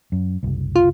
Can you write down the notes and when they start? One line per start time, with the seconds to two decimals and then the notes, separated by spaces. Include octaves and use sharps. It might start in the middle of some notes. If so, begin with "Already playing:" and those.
0.12 F#2
0.43 F#1 C2
0.76 F4